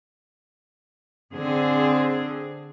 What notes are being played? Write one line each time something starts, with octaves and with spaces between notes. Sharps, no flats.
D3 C4 G#4